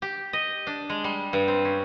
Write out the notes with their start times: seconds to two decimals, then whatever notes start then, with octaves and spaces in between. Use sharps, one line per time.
0.02 G4
0.33 D#5
0.67 D4
0.90 G#3
1.04 G3
1.33 G2
1.48 C4
1.65 C#4